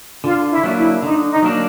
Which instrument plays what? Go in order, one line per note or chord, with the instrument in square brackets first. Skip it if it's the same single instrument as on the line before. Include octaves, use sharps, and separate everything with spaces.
[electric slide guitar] D3 [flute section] F4
[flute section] E4
[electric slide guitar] F#3 A#3 D4
[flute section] E4
[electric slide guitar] D3 [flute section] D#4
[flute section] D#4
[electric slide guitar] F#3 A#3 D4